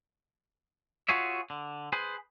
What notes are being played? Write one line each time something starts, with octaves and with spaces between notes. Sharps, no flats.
F4 F#4 G#4 C#5 E5
D3
G#4 B4 C5